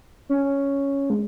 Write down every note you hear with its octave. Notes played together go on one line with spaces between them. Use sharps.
C#4
G#3